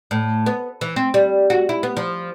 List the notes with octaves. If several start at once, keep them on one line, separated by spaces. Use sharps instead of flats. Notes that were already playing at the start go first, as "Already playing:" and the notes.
A2
B3
E3
C4
G3
F#4
E4
B3
F3